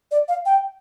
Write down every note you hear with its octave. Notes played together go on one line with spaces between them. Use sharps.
D5
F5
G5